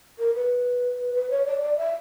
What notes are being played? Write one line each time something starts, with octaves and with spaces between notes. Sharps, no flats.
A#4
B4
B4
C#5
D5
D5
E5